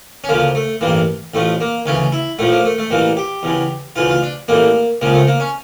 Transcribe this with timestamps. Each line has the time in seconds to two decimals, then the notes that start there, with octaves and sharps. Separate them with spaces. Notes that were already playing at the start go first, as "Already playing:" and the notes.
0.24 C#4
0.29 D2 C#3 F3 A#3
0.55 A3
0.81 A1 G2 E3 A#3
1.34 A1 A2 F3 A3
1.60 A#3
1.86 D2 C#3 E3 C#4
2.12 E4
2.39 A#1 A2 F3 A3
2.52 A#3
2.65 A3
2.78 A3
2.91 A1 A2 E3 A#3
3.17 G4
3.43 E2 C#3 E3
3.96 D2 C#3 E3 F4
4.09 F4
4.22 D4
4.48 A1 A2 E3 A#3
5.01 C#2 C#3 F3 A#3
5.14 A3
5.27 A#3
5.40 C#4